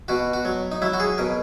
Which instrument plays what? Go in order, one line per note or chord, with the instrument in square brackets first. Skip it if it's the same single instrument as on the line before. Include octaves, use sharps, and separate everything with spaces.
[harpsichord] B2 F#4
F#4
F#3
D#4
F#3 E4
F#4
G#4
B2 A#4